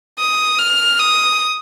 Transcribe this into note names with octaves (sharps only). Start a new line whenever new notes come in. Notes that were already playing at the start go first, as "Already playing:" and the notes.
D#6
F6
D#6